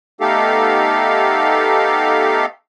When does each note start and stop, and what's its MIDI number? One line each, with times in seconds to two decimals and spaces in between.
0.21 2.46 57
0.21 2.46 59
0.21 2.46 63
0.21 2.46 67
0.21 2.46 69
0.21 2.46 77